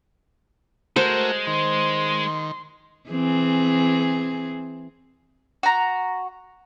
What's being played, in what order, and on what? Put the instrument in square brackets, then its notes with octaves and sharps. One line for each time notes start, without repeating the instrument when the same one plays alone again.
[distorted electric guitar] G#3 [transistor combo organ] A3 F#4 A#4 [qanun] C5
[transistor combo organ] D#3 [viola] C6
[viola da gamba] E3 C4 G#4
[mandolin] F#4 A#5